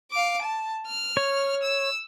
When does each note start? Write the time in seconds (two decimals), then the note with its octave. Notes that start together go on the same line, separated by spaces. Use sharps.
0.11 F5 D6
0.42 A5
0.87 F6
1.17 C#5
1.62 E6